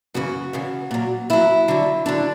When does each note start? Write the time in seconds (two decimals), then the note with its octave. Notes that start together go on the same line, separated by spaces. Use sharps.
0.14 F#2 C#3 E3 F#4
0.53 F#2 C#3 E3
0.91 A#2 F#3
1.30 A#2 F#3 E4
1.68 G2 D3 F#3
2.06 D3 F#3 D4